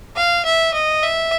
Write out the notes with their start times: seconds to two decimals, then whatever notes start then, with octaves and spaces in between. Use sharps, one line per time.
0.16 F5
0.45 E5
0.74 D#5
1.03 E5